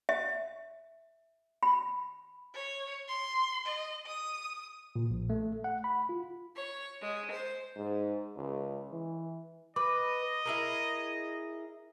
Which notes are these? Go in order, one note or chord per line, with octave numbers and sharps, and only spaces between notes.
E5
B5
C#5
C6
D#5
D#6
A#2
A#1
A3
F#5
B5
F4
C#5
G#3
C5
G#2
C#2
E3
B4 D#5 D6
E4 G#4 A#4